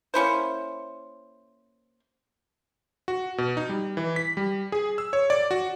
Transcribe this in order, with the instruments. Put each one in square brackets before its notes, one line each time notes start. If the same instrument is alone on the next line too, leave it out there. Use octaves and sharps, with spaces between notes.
[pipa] A#3 C#4 E4 C5
[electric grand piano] F#4
B2
D#4
G3
E3
B6
G3
G#4
E6
C#5
D5
F#4